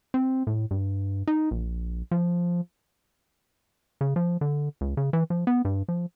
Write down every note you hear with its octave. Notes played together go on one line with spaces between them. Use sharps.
C4
A2
G2
D#4
A#1
F3
C#3
F3
D3
C#2
C#3
E3
F3
B3
G2
F3